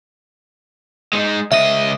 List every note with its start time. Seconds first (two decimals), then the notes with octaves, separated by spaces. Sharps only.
1.13 G#3 D#4
1.52 C#2 D#5 E5